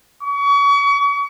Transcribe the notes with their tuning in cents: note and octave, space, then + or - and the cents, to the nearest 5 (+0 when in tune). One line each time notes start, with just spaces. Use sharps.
C#6 +35